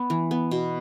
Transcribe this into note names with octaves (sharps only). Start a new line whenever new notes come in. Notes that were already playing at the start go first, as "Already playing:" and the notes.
Already playing: B3
E3
B3
B2